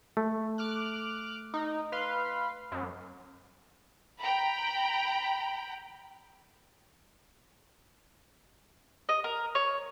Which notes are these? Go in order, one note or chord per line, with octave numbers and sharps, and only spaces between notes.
A3
D6 F6 F#6
D#4
B4 F5 C6
F#2
G5 A#5 B5
D#5
A#4
C#5